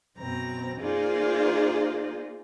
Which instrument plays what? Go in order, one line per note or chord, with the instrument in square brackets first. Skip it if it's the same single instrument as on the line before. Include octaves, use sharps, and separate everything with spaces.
[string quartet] F#2 B2 C4 A#5
A#3 D#4 F4 G#4 C5 D5